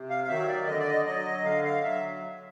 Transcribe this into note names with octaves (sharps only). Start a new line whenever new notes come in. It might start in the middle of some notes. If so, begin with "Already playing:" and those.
Already playing: C3
F5
F5
D#3 F#3 E5
D5
D3 D#5
D5
D#5
F#3 D#5
D3 F5
F5
F#3 E5